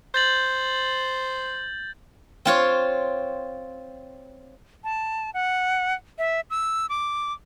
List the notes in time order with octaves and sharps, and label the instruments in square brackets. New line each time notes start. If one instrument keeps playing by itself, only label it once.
[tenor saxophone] C5 [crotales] G6 A6 F#7
[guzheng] C4 F4 C#5
[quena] A5
F#5
E5
E6
D6